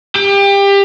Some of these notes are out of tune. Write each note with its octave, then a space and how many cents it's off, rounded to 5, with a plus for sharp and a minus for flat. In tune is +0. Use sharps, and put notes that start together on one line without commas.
G4 +25